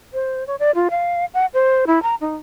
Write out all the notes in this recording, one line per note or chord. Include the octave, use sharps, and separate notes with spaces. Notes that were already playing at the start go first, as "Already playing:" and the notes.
C5
C#5
D5
F4
F5
F#5
C5
E4
A#5
D#4